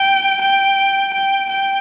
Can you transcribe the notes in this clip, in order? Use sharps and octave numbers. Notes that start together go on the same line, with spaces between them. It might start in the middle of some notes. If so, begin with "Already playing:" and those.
Already playing: G5
G5
G5
G5